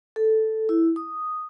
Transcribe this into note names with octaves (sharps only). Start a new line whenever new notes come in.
A4
E4
D#6